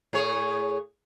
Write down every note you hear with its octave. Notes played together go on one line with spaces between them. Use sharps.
A2 G#4 C#5